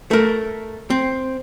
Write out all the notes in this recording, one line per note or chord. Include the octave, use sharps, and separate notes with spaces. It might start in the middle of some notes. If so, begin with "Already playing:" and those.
A3 A#4
C4